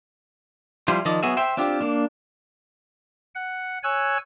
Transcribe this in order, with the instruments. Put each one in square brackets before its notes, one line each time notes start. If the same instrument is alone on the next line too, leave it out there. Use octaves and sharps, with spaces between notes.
[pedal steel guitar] F3 G3 E4 F4 C5
D#3 F3 D5 D#5
F#3 B3 F#4 G#4 E5
C5 E5 G5
C4 D4 F4 G4
A#3 D4
[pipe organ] F#5
C#5 G#5 E6 F#6